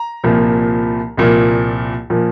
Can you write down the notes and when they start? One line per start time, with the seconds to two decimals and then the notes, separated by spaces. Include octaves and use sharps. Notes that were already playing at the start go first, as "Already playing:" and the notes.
Already playing: A#5
0.24 C2 A#2 F3 A#3
1.17 C2 A#2 F3 A#3
2.10 A#2 F3 A#3